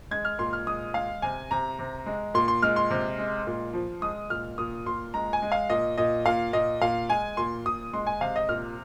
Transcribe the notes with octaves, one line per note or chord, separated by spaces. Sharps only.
G#3 G#6
F6
A#2 C6
F6
G#3 D#6
G#3 F5
C3 G#5
C3 A#5
C3
G#3
A#2 C6
C6
G#3 F6
C6
C3
G#3
A#2
F3
G#3 D#6
A#2 F6
A#2 D#6
A#2 C6
G#3 A#5
G#5
G#3
F5
A#2 D#5
A#2 D#5
A#2 F5
A#2 D#5
A#2 F5
G#3 G#5
A#2 C6
A#2 D#6
G#3 C6
G#5
C3 F5
D#5
A#2 F6